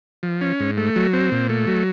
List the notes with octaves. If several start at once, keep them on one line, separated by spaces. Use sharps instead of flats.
F3
C#4
G#2
A3
F#3
C4
A#2
A3
F#3